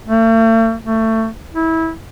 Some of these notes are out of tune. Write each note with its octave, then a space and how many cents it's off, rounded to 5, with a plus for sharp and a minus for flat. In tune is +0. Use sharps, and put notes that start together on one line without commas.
A3 +45
A3 +20
E4 -20